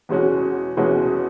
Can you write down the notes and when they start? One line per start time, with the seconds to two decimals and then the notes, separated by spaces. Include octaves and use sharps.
0.09 E2 B2 G#3 C#4 F#4
0.77 E2 B2 G#3 C#4 F#4